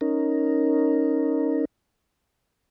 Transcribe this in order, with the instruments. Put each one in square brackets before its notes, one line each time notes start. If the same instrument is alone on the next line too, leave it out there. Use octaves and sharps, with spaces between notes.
[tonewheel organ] C#4 D#4 A#4